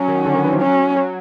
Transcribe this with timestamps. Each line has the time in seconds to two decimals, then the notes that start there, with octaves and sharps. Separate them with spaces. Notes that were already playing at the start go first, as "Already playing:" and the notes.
Already playing: F#3 C#4
0.08 D#3
0.26 D3
0.35 D#3
0.44 E3
0.53 F3
0.61 F#3 C#4
0.96 F#3